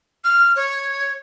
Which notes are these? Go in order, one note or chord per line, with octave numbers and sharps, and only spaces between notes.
F6
C#5